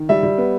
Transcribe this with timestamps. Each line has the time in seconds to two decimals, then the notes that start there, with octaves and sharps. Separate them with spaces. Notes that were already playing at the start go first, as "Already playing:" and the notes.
Already playing: D#3
0.09 G3 E5
0.23 G3
0.38 B3